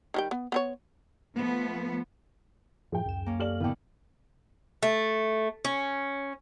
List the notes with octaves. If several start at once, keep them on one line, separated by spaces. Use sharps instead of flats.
D#3 G3 G5
B3
B3 C4 C#5
F3 A3 B3
F#2 A2 F3 G#4 G5
C#2 F#2 E7
A#3 C#4
G4 A4 D5 F6 F#7
F#1 G2 A#2 D3 B3 G5
A3
C#4